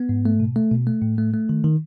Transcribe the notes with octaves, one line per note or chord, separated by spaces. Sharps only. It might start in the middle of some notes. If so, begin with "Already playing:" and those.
Already playing: B3
G#2
A3
B2
A3
B2
A3
A2
A3
A3
D#3
D#3